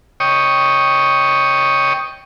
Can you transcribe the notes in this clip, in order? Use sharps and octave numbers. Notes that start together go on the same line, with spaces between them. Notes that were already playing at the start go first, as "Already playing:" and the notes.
C#5 D#5 G5 C#6 D#6